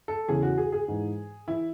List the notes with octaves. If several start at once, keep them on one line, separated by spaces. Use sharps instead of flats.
A4
E2 C#3 E3 G#4
F#4
G#4
G#4
G#2 E3
E3 E4